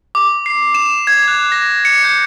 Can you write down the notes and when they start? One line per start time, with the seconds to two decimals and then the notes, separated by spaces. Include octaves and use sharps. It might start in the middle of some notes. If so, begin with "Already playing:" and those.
0.15 D6
0.46 C7
0.75 E7
1.07 G#6
1.28 F#6
1.52 A#6
1.85 C#7
2.04 G6